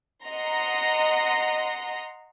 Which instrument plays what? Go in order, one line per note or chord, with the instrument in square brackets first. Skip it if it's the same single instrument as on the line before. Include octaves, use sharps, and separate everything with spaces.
[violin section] D#5 F#5 A#5 C6 A#6